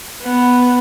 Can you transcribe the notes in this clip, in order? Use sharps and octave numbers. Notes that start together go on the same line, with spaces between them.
B3